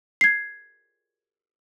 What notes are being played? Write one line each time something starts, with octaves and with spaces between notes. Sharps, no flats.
G#6 C7